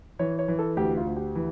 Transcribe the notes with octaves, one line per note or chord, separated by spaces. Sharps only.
E3 C#5
C#5
E3
A4
D2 G4
F4
D2
G4
E3